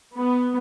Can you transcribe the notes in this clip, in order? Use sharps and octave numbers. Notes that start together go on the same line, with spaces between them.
B3